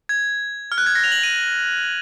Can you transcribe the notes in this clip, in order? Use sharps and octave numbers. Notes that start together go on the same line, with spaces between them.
G#6
F6
F#6
G#6
A#6
F7
F#7
D#7